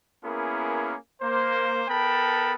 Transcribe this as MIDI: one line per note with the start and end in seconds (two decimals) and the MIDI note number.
0.24 0.95 58
0.24 0.95 59
0.24 0.95 61
0.24 0.95 64
0.24 0.95 68
0.24 0.95 70
1.21 1.83 58
1.21 1.83 72
1.89 2.55 59
1.89 2.55 69
1.89 2.55 70
1.89 2.55 79
1.89 2.55 81
1.89 2.55 83